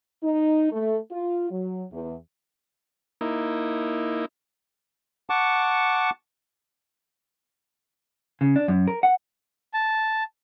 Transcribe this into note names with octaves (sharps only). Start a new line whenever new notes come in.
D#4
A3
F4
F#3
E2
A#3 D#4 E4
F#5 A5 C#6 D6
C#3
D4
F#2
A#4
F#5
A5